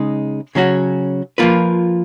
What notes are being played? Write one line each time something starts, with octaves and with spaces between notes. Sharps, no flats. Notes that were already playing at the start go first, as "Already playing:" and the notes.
Already playing: C#3 G#3 D#4
C#3 F#3 C#4 F#4
F3 A#3 F4 B4